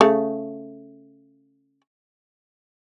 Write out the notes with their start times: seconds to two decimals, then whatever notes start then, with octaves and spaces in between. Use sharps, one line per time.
0.01 C#3 A3